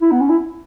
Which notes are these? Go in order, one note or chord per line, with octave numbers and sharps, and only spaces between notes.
E4
B3
C#4
E4